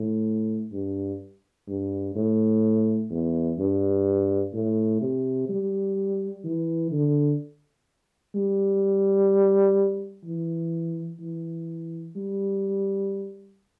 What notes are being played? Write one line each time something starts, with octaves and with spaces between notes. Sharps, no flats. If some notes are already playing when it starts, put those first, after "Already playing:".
Already playing: A2
G2
G2
A2
E2
G2
A2
C3
G3
E3
D3
G3
E3
E3
G3